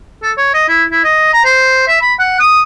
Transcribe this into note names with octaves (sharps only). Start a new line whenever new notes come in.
A4
C#5
D#5
E4
E4
D#5
A#5
C5
E5
B5
F#5
D#6